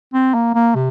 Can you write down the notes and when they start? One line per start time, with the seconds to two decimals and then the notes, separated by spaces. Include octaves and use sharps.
0.14 C4
0.34 A#3
0.55 A#3
0.75 C3